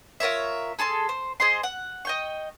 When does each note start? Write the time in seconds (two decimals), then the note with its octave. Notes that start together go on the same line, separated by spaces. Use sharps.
0.20 F4 A#4 C#5 E5
0.79 G#4 A4 A5 C6
1.09 C5
1.40 G#4 C5 D#5 C6
1.63 F#5
2.05 D#5 G5 C#6